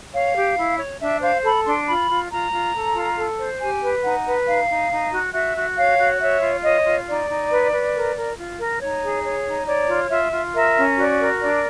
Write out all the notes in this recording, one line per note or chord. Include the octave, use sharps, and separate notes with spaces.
C#5 F5
G4
E4
C#5
D4 E5
C5 F5
A4 B5
D4 C6
F4 B5
F4
F4 A#5
F4
A4
F4
A4
C5
G4 G#5
B4
D#4 F#5
B4
D#4 F5
D#4
D#4
F#4
F#4 E5
F#4
C#5 F5
F#4
C#5 E5
F4
C#5 D#5
F4
D#4 D5
D#4
B4
B4
A#4
A#4
F4
A#4
D#4 C#5
G#4
C#5
D#4
C#5 D5
F4
F4 E5
F4
A#4 E5
C#4
F#4 D5
A#4
D4 D5